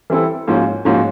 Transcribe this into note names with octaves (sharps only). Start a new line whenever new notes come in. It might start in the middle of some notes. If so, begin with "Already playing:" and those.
E3 G3 C4 E4 A4
G#2 F3 A#3 C#4 F#4
G#2 F3 A#3 C#4 F#4